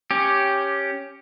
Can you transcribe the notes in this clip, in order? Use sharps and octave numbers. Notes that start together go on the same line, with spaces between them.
C#4 G4